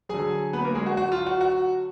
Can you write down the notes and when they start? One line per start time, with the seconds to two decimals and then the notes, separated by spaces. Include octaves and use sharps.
0.09 D3 F#3 G#4 G#5
0.53 B3 B4
0.64 A#3 A#4
0.75 G#3 G#4
0.86 F#4
0.97 F#4
1.12 F4
1.26 F#4
1.41 F#4